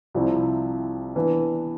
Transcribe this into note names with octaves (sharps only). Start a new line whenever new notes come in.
C2 C3 F3 C4 E4
E3 B3 D4